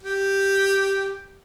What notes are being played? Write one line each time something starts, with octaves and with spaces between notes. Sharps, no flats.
G4